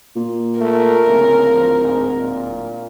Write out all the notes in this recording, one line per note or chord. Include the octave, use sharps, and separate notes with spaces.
A#2
A3 A#4
D1 C#3
F3
G#2
A#2